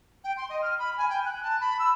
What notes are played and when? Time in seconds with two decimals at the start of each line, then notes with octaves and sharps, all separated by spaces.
0.23 G5
0.36 C6
0.49 D#5
0.61 F6
0.78 B5
0.97 G#5
1.09 G5
1.24 F#6
1.42 A5
1.60 B5
1.79 E6